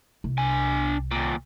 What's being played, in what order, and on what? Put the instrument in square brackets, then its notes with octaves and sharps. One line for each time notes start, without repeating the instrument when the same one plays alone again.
[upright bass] C2
[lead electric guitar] D4 G#5
D#2 A#2